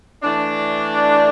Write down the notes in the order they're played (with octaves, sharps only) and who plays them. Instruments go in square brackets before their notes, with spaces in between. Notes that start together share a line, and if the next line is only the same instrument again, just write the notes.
[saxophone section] E3 A3 D4